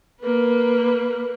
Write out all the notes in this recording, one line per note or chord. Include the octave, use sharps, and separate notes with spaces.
A#3 B4